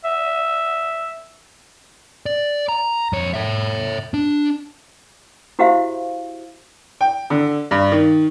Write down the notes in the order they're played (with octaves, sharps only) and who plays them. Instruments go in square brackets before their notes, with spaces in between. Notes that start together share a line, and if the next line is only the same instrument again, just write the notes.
[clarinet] E5
[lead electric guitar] D5
A#5
F2 C#5
C#5 E5
D4
[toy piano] E4 F#4 G4 C5 E5 F5
[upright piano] G5
D3
G2
D#3